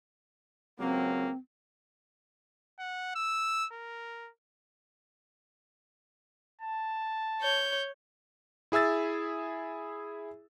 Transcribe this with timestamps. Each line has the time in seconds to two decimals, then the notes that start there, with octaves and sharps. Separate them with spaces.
0.79 C#2 F#3 A#3 C4
2.79 F#5
3.16 E6
3.73 A#4
6.61 A5
7.41 C#5 G6
8.72 E4 G#4 E5 E6 A6